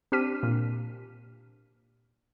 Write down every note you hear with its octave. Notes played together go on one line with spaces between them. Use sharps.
C4 D4 G4 F6 B6 D#7
A#2